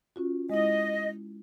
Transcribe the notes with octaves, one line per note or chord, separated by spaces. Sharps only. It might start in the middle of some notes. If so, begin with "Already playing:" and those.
C#4 F4 F#4
G#3 E4 D#5